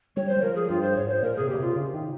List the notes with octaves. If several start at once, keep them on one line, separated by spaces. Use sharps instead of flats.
G3 C#5
C5
G3
F3 A#4
G#4
G2 F4
C5
G#2 C#5
C5
A#2 A#4
C3 G#4
A#2 G4
C3 F4
C#3
D#3